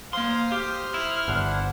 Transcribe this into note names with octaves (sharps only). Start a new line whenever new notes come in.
A#3 C5 F5 C6 D#6
G4 F6
E4
G1 D4 C5 F#5